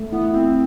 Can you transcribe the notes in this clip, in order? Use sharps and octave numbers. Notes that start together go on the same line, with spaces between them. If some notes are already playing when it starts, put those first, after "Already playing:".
Already playing: A3
B3 E4
C4 E4